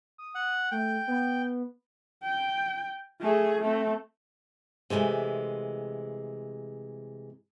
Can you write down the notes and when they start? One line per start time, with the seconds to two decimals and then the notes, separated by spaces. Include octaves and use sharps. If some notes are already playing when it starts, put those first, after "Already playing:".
0.18 D#6
0.35 F#5
0.71 A3 G5
1.07 B3
2.24 G5
3.21 A3 G#4
3.61 A3 C4
4.90 C3 E3 G#3 A3